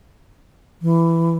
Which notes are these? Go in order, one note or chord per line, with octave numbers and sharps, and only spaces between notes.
E3